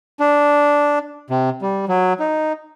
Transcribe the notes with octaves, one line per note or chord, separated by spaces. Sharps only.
D4
C3
G3
F#3
D#4